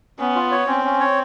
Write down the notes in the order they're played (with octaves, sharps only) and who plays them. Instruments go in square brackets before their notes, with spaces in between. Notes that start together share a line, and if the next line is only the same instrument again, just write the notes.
[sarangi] B3 [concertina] C#4
[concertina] F4
C#5
[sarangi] C4 [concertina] C#4
[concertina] C#4
C#5